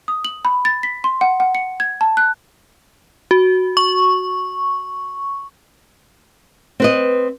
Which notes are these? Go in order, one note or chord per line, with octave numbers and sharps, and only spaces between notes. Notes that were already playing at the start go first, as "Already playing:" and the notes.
D#6
F#7
B5
A6
B6
C6
F#5
F#5
C#7
G#6
A5
F#6
F#4
C#6
C4 B4 D#5